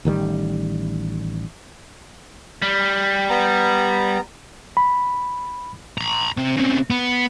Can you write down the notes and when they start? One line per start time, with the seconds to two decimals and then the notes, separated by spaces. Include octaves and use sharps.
0.05 A1 D#3 F#3 G3
2.62 G3
3.30 B3 A#5
4.77 B5
5.98 A#5 B5
6.37 C3
6.57 C#3 C4
6.90 B3